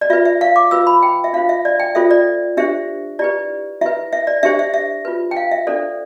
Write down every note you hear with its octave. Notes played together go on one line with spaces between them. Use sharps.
D5
F4 B4 E5
E5
F5
D6
F4 B4 E6
B5
G5
E5
D4 F4 C5 F5
E5
D5
G5
F4 A4 C5 E5
D5
D4 G4 C5 E5
E4 G4 B4 D5
E4 B4 E5
E5
D5
D4 G4 C5 E5
E5
E5
F4 B4
G5
F5
E5
D4 A4 C5 D5